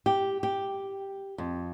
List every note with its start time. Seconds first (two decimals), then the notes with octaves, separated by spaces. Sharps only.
0.06 G4
0.43 G4
1.38 F2